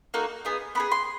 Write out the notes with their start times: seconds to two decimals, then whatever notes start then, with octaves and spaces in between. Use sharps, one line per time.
0.14 A#3 D#4 F#4 A4
0.45 B3 D#4 G#4
0.75 B3 D#4 G#4 B5
0.91 C6